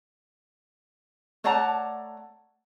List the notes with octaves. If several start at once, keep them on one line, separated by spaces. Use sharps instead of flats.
A3 C#5 D5 F#5 A5 A#5